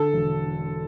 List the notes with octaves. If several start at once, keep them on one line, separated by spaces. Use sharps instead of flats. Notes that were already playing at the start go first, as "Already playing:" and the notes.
Already playing: D3 A4
E1